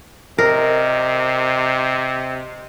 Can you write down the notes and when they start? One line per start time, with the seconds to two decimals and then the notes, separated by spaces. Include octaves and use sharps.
0.38 C3 A#4 C5 D5 D#5